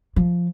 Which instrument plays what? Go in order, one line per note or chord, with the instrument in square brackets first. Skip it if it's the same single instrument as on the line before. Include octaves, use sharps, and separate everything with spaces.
[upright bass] F3